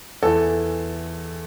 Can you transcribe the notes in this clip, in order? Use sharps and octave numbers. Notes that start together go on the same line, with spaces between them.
E2 E3 A4